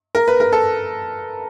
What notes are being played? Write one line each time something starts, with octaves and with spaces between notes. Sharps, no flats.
A#4
B4
A#4
A4